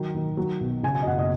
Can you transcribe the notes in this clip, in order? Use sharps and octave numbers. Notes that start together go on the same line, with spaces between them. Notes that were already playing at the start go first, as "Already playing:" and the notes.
Already playing: D#3 F#3
D#3
F#3
B1
C#3 G#5
G#5
D#5
F#1 F#5
D#5